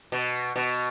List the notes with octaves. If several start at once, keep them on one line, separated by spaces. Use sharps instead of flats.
B2
B2